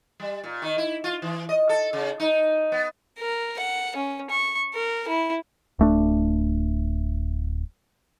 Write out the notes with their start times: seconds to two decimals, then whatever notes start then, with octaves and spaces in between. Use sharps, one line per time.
0.20 G3
0.44 A#2
0.62 D#3
0.78 E4
1.04 F4
1.22 E3
1.49 D#5
1.69 A4
1.93 C#3
2.20 D#4
2.72 B3
3.19 A#4
3.59 F#5
3.96 C#4
4.30 C#6
4.75 A#4
5.08 E4
5.79 D1 A3 D4